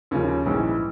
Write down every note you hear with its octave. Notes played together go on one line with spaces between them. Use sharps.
D#2 C#3 F3 C#4
A#1 G#2 E3 G3